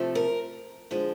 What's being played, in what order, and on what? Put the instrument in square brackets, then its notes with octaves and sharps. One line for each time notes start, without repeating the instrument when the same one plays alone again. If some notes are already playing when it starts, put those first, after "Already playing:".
Already playing: [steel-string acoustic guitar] C3 F3 A3
A#4
D3 F3 G#3